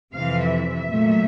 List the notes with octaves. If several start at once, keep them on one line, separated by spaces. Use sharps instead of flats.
F2 C3 E3 F5
E5
A#2 F#3 A3